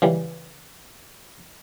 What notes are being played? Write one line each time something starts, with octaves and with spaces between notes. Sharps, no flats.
C#3 E3 G3